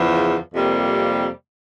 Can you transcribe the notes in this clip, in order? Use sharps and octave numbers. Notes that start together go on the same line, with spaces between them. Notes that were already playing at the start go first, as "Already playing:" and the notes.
Already playing: E2 C#3 F3
F2 C3 G3 A#3